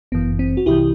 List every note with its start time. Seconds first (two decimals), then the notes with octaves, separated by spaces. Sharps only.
0.12 G1 F#2 E3 B3
0.39 C4
0.57 F#4
0.66 C2 C3 E3 E4 G4